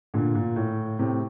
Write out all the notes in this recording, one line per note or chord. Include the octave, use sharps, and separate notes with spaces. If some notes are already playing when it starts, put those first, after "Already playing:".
A#2 D3
A#2
A2
A2 C3